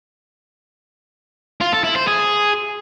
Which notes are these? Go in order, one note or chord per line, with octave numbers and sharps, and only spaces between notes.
F4
A4
E4
C5
G#4